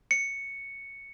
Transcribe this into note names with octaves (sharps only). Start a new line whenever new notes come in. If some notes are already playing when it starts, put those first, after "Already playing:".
C#7